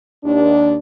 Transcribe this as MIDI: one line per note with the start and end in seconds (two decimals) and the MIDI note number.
0.24 0.76 39
0.24 0.76 62